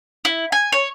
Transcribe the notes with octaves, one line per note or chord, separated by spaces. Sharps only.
E4
G#5
C#5